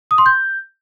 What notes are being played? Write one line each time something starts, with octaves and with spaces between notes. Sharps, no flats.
D#6
C6
G6